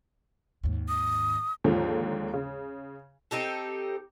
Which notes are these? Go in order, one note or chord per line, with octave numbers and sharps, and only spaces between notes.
D#2 G#2
D#6
D#2 G#2 D3 F3
C#3
C4 D#4 G4 A4